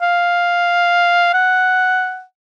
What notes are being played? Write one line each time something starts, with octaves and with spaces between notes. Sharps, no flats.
F5
F#5